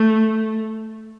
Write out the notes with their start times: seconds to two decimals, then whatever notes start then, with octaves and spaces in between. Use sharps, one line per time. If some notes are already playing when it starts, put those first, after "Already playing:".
Already playing: A3